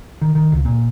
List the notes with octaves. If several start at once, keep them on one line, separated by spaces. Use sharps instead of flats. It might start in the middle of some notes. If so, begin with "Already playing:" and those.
D#3
D#3
C#2
A#2